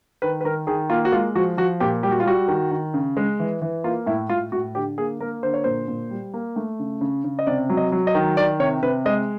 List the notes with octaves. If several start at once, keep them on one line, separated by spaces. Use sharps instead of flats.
D#3 B4
B4
D#3 A#4
D#3 G#4
A#3 F4
F#4
G#3 F4
F3 F#4
F3 F#4
A#2 G4
G3 G4
F#4
F4
G3 F#4
D#3
D#3
C#3
G#3
E3
E3
A#3 F4
A2 E4
A2 F4
A2 F#4
D3 G4
A#3 G#4
A#3 A#4
D3 C5
C#5
A#2 C5
A#2
G3
A#3
A3
C#3
C#3
C#3
D#5
C3 D5
F#3
D#5
F#3
D#5
D#3
D#3 D5
C3 C#5
C3 B4
G#3 D#5